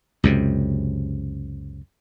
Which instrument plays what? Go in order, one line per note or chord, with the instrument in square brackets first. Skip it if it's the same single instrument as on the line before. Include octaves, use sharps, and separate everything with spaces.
[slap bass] C#2 F#2 C3